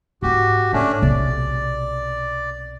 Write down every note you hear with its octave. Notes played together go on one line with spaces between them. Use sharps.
G#2 E4 F#4 G4
A2 A3 C#4 D4
B1 C3 D5